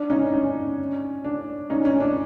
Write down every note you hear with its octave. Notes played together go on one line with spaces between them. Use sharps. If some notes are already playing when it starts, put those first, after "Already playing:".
Already playing: D4
C#4 D#4
C#4
D4
C#4 D#4
C#4
D4